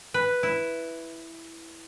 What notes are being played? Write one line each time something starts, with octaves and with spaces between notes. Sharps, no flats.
B4
E4